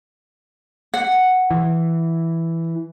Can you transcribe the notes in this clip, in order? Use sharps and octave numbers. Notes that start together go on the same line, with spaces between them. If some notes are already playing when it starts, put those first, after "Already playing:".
F#5
E3